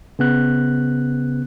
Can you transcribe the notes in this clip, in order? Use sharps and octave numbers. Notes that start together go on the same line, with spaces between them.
C#3 B3 F#6